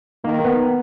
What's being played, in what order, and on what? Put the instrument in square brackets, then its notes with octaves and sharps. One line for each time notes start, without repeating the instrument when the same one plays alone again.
[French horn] D#3 [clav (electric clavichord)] A#3
[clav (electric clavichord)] B3